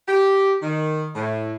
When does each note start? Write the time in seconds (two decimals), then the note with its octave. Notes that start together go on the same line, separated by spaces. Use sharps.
0.08 G4
0.62 D#3
1.15 A2